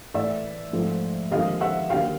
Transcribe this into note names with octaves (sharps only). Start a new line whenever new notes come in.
A2 E3 A3 D5 E5
G#2 F3 A3
D#2 D3 F3 G#3 D#5 F5
E5 F#5
D#2 D3 F#3 F5 G5